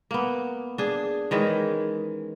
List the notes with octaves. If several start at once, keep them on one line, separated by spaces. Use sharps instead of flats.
A#3 B3
D4 G#4
D#3 E3 G#3 C#4